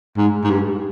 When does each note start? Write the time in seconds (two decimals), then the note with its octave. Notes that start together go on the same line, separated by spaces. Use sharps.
0.17 G#2
0.44 G#2
0.50 G2